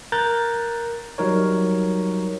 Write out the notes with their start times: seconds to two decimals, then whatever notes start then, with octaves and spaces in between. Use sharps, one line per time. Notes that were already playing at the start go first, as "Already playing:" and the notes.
0.12 A#4 A#5 F#6 G6 A6
1.18 F#3 G3 D#4 A#4 C#5